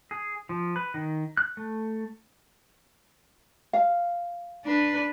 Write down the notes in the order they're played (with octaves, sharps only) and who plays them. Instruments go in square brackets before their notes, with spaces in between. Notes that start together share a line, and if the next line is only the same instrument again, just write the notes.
[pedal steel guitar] G#4
F3
B4
D#3
F#6
A3
[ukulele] F5
[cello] D4 B4